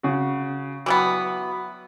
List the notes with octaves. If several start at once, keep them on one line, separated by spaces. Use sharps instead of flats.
C#3 F#4
E3 F#3 G3 B3